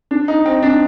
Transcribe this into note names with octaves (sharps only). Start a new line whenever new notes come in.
D4
D#4
C4
D4